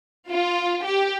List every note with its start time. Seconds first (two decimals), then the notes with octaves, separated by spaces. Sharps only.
0.30 F4
0.86 G4